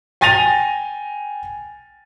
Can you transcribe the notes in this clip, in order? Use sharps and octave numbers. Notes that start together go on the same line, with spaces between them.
G5 G#5 A6 A#6 D#7 F7